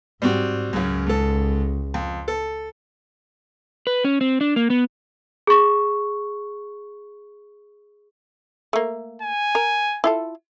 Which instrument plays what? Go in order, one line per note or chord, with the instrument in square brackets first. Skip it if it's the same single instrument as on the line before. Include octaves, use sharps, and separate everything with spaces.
[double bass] G#2 [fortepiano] G3 C4 F#4
[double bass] C#2 [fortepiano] F#2 C#3
[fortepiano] G#2 A4
F2
A4
[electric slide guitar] B4
C#4
C4
D4
A#3
B3
[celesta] G#4 C#6
[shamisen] A3 A#3
[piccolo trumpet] G#5
[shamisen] A#4
E4 F4 A4